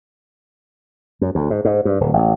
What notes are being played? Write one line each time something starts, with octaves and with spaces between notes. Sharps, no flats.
F#2
D2
G#2
G#2
G2
D1
A1